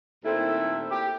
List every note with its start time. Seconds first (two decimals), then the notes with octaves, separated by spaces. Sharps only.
0.24 D#2 A#2 A3 C4 E4 A4
0.90 G4